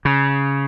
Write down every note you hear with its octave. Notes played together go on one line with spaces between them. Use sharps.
C#3